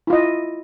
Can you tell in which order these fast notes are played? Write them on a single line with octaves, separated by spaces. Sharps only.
E4 F4 D#5